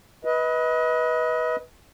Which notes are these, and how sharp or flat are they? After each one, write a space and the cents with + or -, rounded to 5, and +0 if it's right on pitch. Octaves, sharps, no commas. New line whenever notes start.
B4 -10 D#5 +30